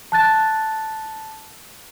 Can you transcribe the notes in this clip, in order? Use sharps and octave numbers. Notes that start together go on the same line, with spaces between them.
A5 F#6 A6